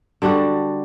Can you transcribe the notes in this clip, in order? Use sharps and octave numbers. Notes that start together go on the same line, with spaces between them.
D3 G3 D4 F#4